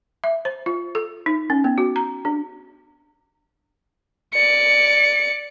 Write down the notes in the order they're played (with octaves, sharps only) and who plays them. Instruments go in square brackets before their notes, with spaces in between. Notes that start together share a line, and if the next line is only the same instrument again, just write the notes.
[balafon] E5
C5
F4
A4
D#4
C#4
B3
F#4
A#5
D4
[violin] D5 C#7